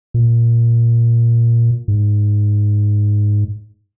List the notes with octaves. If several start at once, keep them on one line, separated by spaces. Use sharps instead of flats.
A#2
G#2